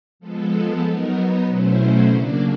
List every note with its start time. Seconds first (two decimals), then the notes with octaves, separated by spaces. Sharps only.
0.19 F3 G#3 B3 A4
0.82 F#3 B3 D#4 A#4
1.14 B4
1.44 B2 F#3 A3 C#4 E4 C5
2.06 C#3 F#3 A#3 D4 D5